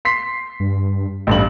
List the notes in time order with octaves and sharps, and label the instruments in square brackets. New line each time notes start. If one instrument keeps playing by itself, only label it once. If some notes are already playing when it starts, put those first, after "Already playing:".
[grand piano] C6 B6 C7
[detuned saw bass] G2
[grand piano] A1 G2 F#7 [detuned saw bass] B2